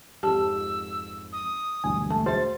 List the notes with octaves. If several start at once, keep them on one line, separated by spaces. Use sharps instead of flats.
F2 G#2 G4 A5 E6
D#6
E1 D2 G2 G#5
A3 A5
F#4 G#4 C5 E5 A6